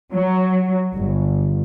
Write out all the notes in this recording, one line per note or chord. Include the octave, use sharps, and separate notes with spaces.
F#3
G1